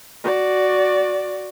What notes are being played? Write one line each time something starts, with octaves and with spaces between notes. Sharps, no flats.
F#4 D5